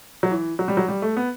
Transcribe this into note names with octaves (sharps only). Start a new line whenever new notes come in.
F#3
E3
F#3
G3
F#3
G3
A3
B3